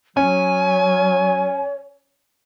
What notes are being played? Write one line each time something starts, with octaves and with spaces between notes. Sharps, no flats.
F#3 C#4 C#5 G#5